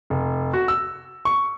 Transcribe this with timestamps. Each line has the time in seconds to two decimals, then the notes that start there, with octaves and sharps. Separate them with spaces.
0.10 F1
0.53 F#4
0.68 E6
1.25 C#6